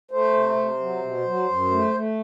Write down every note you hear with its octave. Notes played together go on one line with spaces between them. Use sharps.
A3 C5
C3
C3
F#3
B2
F#3
F#2
A3
A3